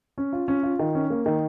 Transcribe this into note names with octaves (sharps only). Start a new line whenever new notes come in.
C#4
F4
C#4
F4
D#3
C#4
A#3
D#3